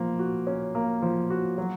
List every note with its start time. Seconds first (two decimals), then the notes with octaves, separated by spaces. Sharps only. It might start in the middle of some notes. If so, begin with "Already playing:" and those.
Already playing: F3 A#3
0.19 F#4
0.47 C#4
0.75 A#3
1.02 F3
1.30 F#4
1.58 F#3